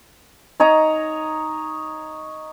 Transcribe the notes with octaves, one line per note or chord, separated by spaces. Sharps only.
D#4 C#5 D#5 A#5